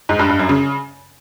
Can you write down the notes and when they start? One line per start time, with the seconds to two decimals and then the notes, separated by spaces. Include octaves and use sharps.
0.09 G#2
0.19 G2
0.29 G2
0.39 F#2
0.49 C#3